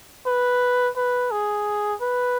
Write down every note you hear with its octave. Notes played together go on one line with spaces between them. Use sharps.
B4
B4
G#4
B4